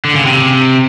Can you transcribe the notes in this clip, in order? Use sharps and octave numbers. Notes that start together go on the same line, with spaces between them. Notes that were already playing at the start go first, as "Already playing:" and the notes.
D3
C#3
C3